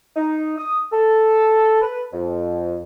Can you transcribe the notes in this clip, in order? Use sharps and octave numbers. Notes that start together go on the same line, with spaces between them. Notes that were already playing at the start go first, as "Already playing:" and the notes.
D#4
D#6
A4
B4
F2